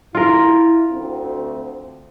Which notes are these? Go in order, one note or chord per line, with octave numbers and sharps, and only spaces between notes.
E4 F4 A#4
D2 C4